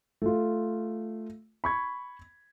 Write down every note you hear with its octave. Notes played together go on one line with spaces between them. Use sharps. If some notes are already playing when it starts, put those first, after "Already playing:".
A3 F4
B5 C#6 G#6